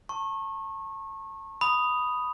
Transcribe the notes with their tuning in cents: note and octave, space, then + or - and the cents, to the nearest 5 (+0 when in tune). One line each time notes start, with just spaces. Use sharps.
A5 +30 C#6 -30
B5 +0 D#6 -5